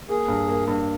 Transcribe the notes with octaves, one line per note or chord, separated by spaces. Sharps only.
A#3 G#4
G2
A#3
G2